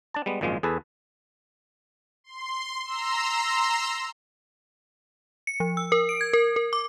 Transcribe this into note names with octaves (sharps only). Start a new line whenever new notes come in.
D4 A5
G3 G#3 B3
G#1 F#2 A#2 F3 G#3
E2 G#4 A4 B4
C6
A#5 C6 E6
C#7
F3
E6
A#4
D7
G#6
A#4
A#4
D6